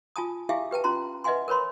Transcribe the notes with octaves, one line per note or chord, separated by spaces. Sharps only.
F4 G#5 A5 D#6
E4 G4 G#4 E5 F5 G#5
G4 B4 G5 A5
C#4 F4 A#5 C6
B4 D#5 E5 F#5 G#5 C6
A#4 B4 C#5 B5 C6